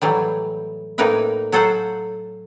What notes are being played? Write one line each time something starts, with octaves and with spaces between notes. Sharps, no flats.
A2 E3 F#3 G3
A2 A#3 D#4 A#4 B4 E5
F#3 A4 C5 F5 F#5